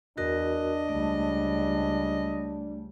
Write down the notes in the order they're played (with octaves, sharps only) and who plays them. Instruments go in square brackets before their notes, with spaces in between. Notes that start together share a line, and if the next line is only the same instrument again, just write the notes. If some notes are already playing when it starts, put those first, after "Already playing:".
[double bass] E2 [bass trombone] D4 [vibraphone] F#4 A#4 [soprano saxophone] D#5
[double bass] C#2 G3 [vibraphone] A3